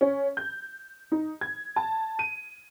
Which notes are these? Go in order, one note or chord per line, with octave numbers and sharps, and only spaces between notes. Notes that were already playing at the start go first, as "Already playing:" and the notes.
C#4
G6
D#4
G#6
A5
D#7